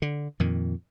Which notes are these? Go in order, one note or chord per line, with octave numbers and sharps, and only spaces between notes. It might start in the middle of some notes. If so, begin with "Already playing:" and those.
D3
F2 A#2 D#3